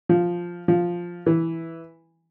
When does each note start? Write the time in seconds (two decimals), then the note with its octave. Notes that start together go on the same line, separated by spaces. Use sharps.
0.09 F3
0.68 F3
1.26 E3